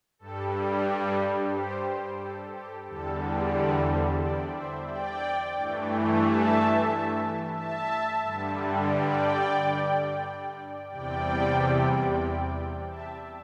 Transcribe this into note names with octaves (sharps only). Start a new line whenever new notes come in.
G2 G3 A4
G4
G4 C5
A4
G4
E2 D3 G3 A4
A4 D5
C5 E5
D5 G5
C5 E5
D5 G5
G2 E3 A3
E5 A5
E5 A5
G2 D3 G3
D5 G5
E2 C3 G3 D5 G5
E5 A5